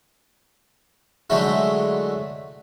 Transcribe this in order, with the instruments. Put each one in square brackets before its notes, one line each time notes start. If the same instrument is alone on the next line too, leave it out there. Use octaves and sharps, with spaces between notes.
[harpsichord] D3 F#3 G#3 A3 E4